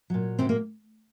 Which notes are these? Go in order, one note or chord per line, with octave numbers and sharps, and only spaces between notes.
A#2 F#3
C3 C4
A#3